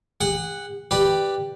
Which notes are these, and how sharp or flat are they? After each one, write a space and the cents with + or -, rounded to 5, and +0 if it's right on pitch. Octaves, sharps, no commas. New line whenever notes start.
G#4 -45 F#5 +0
G4 +0 B4 +0 D5 +5